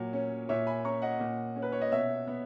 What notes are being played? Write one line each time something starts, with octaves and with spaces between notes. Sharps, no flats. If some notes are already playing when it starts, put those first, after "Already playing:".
Already playing: A#2 F#3
C#4
A#2 C#5 E5
G#5 B5
C#4 A#5 C#6
D#5 F#5
A#2
C#4
B4
C#5
D#5
B2 C#5 E5
B3